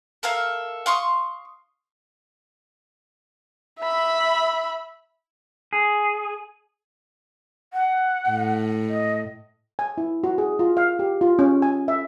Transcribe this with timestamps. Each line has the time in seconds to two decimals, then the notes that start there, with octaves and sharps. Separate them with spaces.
0.23 A4 A#4 E5 F5
0.86 F5 C6 C#6 D#6
3.80 E5 B5
5.73 G#4
7.73 F#5
8.30 A2
8.89 D#5
9.79 G#5
9.98 E4
10.24 F#4
10.38 G#4
10.59 F4
10.77 F5
10.99 G4
11.21 F4
11.39 C#4
11.62 G#5
11.88 E5